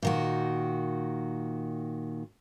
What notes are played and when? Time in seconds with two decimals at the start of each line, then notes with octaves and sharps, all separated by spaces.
0.02 A#2 D#3 F#4